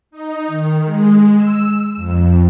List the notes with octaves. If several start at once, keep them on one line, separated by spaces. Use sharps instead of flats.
D#4
D#3
G#3
E6
F2